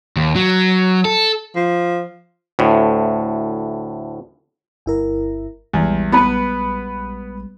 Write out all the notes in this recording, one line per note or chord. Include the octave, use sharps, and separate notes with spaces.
D#2
F#3
A4
F3
D2 A2
G1 E4 A#4
A#1 E2 G3 G#3
B3 B4